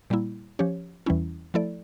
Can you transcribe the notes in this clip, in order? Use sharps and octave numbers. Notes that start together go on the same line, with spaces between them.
A#2 G3 A#3 E4
F3 C#4 G4 C#5
E2 E3 G3 C#4 E4
F3 A3 E4 A4 D5